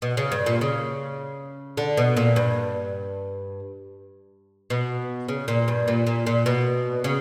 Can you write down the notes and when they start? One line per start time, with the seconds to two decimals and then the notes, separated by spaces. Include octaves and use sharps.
0.02 B2
0.17 C#3
0.32 G2
0.46 A#2
0.61 C#3
1.77 D3
1.97 B2
2.17 A#2
2.36 G2
4.70 B2
5.29 C#3
5.48 A#2
5.68 G2
5.88 A#2
6.07 A#2
6.27 A#2
6.46 B2
7.04 C#3